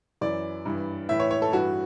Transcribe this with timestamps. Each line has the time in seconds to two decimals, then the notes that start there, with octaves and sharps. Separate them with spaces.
0.21 F#2 E3 D5
0.66 G2 E3
1.09 A2 E3 E5
1.20 C#5
1.31 C#5
1.42 A4
1.53 G2 E3 F#4